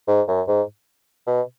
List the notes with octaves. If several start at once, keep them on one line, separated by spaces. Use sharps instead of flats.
G#2
F#2
G#2
B2